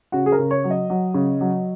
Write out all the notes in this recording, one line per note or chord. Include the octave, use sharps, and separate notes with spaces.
C#3 F#4
G#4
A#4
C#3
C#5
F#3
D#5
F#3
C#3
F#3